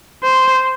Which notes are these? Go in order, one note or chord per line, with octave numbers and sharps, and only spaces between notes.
C5